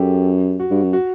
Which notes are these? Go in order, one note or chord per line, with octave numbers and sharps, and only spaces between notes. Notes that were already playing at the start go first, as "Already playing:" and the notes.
Already playing: F#2 G4 A4
F#4
G2
F#2
F#4